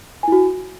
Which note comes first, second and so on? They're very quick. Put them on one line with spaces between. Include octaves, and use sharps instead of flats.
G#5 E4 F#4